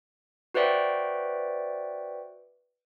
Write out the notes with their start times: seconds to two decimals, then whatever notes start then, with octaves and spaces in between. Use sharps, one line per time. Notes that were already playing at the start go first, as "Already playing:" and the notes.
0.54 F#4 B4 C5 D5 E5 G5